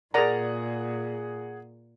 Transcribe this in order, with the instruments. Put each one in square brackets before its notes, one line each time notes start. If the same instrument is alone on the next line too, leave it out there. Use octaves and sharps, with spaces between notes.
[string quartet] A#2 [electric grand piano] G#4 F#5 [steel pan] A#4 D5 A#5